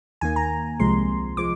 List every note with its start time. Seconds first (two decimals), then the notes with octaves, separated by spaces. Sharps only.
0.21 D#2 D#3 A#3 G#5
0.36 A#5
0.80 C2 C3 F3 G#3 C6
1.37 F3 G#3 D6